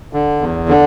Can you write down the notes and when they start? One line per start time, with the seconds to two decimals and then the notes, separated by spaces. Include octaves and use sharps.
0.13 D3
0.41 E2
0.68 D3